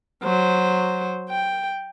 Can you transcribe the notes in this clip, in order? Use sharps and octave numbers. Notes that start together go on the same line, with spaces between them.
F#3 C5
G5